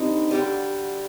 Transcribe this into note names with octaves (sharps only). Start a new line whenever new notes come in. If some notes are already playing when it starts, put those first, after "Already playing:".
Already playing: D3 G3 C4 D#4
D2 D3 G3